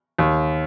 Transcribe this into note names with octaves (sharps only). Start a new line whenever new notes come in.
D#2